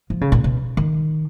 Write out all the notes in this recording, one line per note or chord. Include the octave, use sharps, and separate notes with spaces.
F3
C#3
A#2
B2
D#3